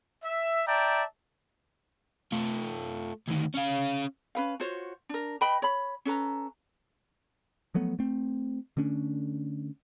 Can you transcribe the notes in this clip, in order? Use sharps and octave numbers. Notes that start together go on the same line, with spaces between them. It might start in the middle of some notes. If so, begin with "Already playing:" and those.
E5
D5 E5 G5 A5 A#5
A3 F4
D2 D#3
C#4 F5
C#4 B4 F5
F4 F#4 C5 C#5
D4 A#4
B4 D#5 G5 B5
C#5 B5
C#4 A4 B4 A#5
F3 F#3 A3 B3
A3 C4
D3 A3 C#4 D4